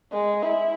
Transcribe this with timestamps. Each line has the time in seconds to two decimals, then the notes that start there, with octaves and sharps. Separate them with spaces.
0.13 G#3
0.43 E4